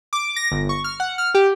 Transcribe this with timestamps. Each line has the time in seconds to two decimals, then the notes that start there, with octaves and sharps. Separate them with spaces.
0.13 D6
0.36 A#6
0.52 G1
0.69 C#6
0.84 F6
1.00 F#5
1.18 F6
1.35 G4